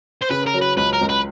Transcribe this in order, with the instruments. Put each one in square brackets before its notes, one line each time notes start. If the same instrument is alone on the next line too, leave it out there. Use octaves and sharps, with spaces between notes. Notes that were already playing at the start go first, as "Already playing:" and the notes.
[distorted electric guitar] C5
[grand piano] C#3 [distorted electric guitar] B4
[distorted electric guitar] A#4
[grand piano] F#3
[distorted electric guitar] B4
[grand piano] C#2 [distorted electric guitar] B4
[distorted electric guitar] A#4
[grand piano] C#2
[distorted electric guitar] B4